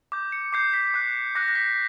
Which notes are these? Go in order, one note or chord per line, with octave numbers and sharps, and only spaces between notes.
D6 G6
C#7
D6 G6 C7
B6
D6 F#6
D6 F#6 A#6
A#6
B6